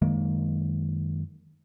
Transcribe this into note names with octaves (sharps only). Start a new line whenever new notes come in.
F#2 D#3 G#3 A#3